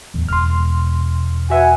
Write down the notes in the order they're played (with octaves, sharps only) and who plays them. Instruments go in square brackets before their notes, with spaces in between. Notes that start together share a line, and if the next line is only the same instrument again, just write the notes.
[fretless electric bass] D1 E2
[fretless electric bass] E1 [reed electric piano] C6 F6
[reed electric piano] F#4 E5 [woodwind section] B4 F#5 G#5